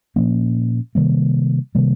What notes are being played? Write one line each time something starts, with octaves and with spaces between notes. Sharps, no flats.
A#2 F3 A#3 C#4
C3 D#3 G3 A#3
C3 D#3 G3 A#3